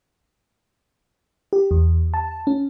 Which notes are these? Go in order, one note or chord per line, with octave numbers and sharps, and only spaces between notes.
G4
E2
A5
C#4